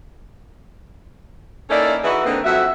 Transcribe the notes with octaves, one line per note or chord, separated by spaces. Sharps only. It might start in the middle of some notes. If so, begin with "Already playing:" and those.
A#3 C#4 D#4 E4 A4 D5
E3 D#4 E4 F#4 G#4 B4
D3 A#3 C4 D#4 B4
F2 F#3 F#4 E5